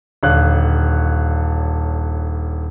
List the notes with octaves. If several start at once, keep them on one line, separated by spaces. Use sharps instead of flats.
D#1 D3 C#5 F5 F#6